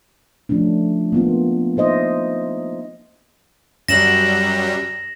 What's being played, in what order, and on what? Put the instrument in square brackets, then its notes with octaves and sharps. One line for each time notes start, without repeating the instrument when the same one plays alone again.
[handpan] F3 A3 C#4 D4
A#3 B3 F4
D#4 C5 D#5 E5
[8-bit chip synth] F#2 F#3 G3 [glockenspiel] A#6 E7 F#7